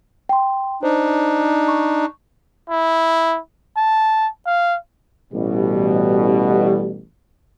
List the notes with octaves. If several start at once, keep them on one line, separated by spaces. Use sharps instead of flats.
G5 C6
D4 D#4 C5
C#6
E4
A5
F5
A1 B2 G3